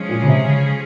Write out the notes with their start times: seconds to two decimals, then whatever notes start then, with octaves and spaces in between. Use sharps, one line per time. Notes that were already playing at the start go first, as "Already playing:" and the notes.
Already playing: F3 G#3 C#4 G#4
0.09 A#2
0.22 C#3
0.27 C3
0.46 C#3